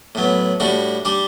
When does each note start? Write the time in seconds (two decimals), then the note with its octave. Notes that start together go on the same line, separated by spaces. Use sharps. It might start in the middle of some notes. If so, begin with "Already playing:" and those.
0.15 A2 F#3 B3
0.60 A2 G3 D4 F#4
1.05 G3 D4 G4